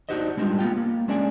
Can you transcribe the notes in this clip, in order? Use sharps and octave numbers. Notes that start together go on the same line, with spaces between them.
D4 D#4 F#4 G4 C5 D#5
G3 G#3 D4 D#4 F4 G4
A#3 B3 F4 G5
A#3
G#3 C#4 D4 G#4 D5 G#5